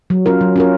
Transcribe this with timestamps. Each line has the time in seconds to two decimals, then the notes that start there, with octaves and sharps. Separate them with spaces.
0.10 F#3
0.26 C#4 F4 A#4
0.41 F#3
0.56 C#4 F4 A#4